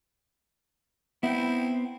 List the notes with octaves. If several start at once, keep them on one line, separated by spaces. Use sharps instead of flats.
B3 C4 E4 G5